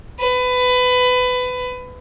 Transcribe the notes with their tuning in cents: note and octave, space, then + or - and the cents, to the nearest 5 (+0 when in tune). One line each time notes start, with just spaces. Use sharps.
B4 +20